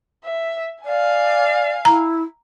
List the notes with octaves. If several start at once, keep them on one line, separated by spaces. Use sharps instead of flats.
E5
D5 F5 G#5
E4 A#5